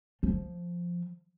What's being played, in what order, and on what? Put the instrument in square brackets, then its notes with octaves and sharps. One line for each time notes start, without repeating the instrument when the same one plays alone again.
[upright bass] F3